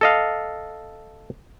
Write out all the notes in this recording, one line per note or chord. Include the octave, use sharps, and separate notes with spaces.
A4 D#5 F5